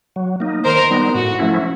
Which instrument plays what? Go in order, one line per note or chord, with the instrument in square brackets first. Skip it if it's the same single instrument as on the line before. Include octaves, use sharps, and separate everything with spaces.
[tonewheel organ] F#3
A#3 D#4
[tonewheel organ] D#3 [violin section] A#4 C5
[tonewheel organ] G3 B3 D#4
[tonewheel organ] A2 [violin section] F#4
[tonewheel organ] F3 A3 C#4 E4